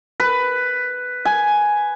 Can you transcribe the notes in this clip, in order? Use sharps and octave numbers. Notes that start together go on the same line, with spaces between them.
B4
G#5